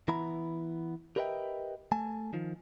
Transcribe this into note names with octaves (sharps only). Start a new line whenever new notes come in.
E3 B3 E4 A#5 B5
G4 A#4 B4 D#5 E5 G5
A3 G#5 A5
D#3 F3